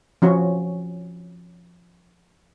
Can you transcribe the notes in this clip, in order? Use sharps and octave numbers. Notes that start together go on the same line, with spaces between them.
F3 C#4 F#4